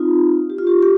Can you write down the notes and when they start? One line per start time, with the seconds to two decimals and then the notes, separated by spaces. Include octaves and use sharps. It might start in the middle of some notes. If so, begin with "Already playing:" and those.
Already playing: C4 D#4 F4
0.50 G4
0.58 F4
0.67 G4
0.83 G4